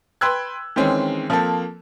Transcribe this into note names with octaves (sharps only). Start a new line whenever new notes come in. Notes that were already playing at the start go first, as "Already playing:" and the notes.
B4 G5 C6 E6 F#6 G#6
D#3 E3 G#3 C4 C#4
F3 A#3 C4 A4